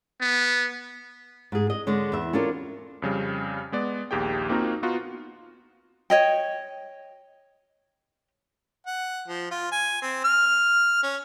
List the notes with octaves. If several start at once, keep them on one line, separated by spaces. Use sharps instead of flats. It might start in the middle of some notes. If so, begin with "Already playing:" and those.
B3
G#2 G#4
D#5
D3 G#3 C#5
E2 E5
C#4 D4 F4 A4 A#4
F2 C#3 G3
G#3 B3 D5
A#1 D#2 G4 G#4 G5
A#3 C4 D#4 F4 F#4 A#4
B3 D#4 F4 F#4
C#5 D#5 G5
F#5
F3
F4
G#5
C4
F6
C#4